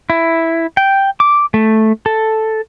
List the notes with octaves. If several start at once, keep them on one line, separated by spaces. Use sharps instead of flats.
E4
G5
D6
A3
A4